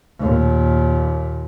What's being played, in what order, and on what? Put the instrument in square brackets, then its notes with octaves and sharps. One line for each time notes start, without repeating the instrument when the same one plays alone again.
[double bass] D#2 A#2